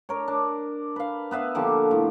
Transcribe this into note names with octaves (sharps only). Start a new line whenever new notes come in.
D4 A#4 C#5
D4
B4 F5
B3 B4 E5 F5
D3 F3 A#3 G4
A2